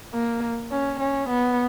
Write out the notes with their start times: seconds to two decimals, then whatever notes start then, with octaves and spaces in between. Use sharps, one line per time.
0.14 A#3
0.72 C#4
1.00 C#4
1.30 B3